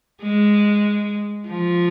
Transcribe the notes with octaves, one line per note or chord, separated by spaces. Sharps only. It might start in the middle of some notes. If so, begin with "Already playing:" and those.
G#3
F3